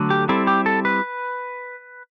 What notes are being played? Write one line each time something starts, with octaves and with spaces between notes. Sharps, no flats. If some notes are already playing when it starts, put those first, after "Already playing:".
Already playing: D3 F#3 A3
G4
G3 C4 E4 A4
G4
A4
B4